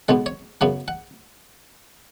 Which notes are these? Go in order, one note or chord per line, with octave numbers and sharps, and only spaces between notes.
B1 B2 G#3 B3 F#5
C#5
F#2 C#3 F#3 B3 F#5
F#5